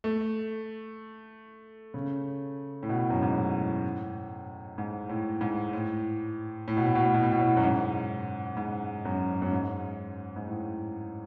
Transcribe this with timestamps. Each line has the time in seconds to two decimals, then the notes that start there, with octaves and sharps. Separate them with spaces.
0.04 A3
1.94 C#3
2.83 A2
2.89 B2
3.10 F#2
3.22 G#2
3.37 A2
4.78 G#2
5.09 A2
5.41 G#2
5.73 A2
6.68 A2
6.77 B2
6.87 A2
6.95 B2
7.05 A2
7.14 B2
7.23 A2
7.32 B2
7.41 A2
7.57 F#2
7.63 G#2
8.57 G#2
9.05 F#2
9.42 F#2
9.52 G#2
10.36 G#2
10.47 A2